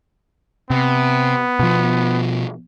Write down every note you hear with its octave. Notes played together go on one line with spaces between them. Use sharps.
C3 B3
B2 F3